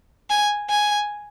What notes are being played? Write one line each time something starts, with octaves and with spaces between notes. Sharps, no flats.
G#5
G#5